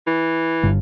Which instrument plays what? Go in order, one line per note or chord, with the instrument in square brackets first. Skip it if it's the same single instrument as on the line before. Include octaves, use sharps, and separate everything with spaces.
[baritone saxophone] E3
[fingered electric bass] G1